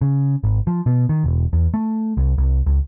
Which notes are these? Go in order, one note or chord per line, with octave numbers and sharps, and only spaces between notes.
C#3
G#1
F3
B2
D#3
E1
E2
A3
C2
C2
C#2